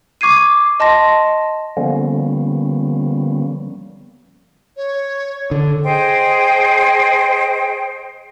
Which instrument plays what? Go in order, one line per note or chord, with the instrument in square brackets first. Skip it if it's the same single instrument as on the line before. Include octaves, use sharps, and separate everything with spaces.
[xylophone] C#6 D6 G#6 C7 D#7
D#5 A5 C6 A#6
[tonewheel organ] D3 F3 G3 A#3 B3 C#4
[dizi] C#5
[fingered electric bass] D3
[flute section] G#4 C5 D#5 G5